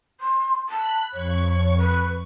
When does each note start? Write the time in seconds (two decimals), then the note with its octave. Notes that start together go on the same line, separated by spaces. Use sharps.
0.20 C6
0.68 A5 B5 F#6
1.12 F2 C#5 C#6
1.77 B4